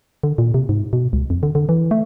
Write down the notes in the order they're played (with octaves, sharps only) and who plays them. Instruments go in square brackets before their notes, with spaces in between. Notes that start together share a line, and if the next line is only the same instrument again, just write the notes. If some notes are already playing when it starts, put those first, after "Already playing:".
[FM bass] D3
A#2
C3
G#2
B2
C#2
F2
D3
D3
E3
A3